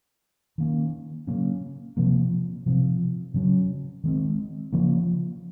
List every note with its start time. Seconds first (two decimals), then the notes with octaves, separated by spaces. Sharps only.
0.58 D#3 A#3 C#4
1.27 C#3 F#3 A#3 C#4
1.97 C3 F3 A#3
2.66 C3 F3 C4
3.34 C#3 F#3 C#4
4.04 D#3 G#3 C4
4.73 C#3 F3 A#3